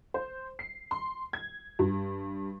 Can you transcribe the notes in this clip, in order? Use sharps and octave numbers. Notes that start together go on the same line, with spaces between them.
C5
C7
C6
G#6
G2